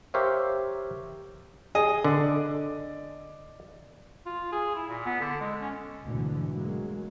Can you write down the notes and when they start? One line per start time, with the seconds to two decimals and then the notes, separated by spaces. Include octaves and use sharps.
0.14 G4 A#4 C5 C#5 E5 F5
1.75 G#4 D#5
2.04 D3 D5
4.26 F4
4.52 G#4
4.75 E4
4.88 A#2
5.06 B3
5.20 D3
5.41 G#3
5.61 C#4
6.05 D2 G#2 B2 D3 E3
6.53 F#3 G#3 A#3